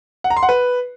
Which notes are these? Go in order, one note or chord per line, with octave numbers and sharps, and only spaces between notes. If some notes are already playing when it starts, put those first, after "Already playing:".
F#5
A#5
C6
F#5
B4